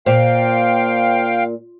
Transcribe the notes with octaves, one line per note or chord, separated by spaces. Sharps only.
A#2 C5 F5 G5